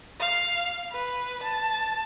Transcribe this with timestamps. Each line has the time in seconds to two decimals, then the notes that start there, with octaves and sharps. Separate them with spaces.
0.20 F5
0.92 B4
1.43 A5